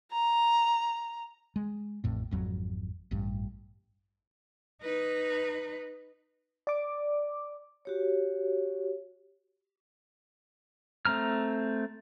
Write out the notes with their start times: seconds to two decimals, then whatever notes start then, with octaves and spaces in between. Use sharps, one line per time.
0.11 A#5
1.56 G#3
2.04 A1 F2 A2
2.31 G#1 F2 F#3
3.11 A1 G2
4.82 D#4 B4
6.67 D5 D6
7.85 F#4 G4 C#5
11.05 A3 C4 A#5 F6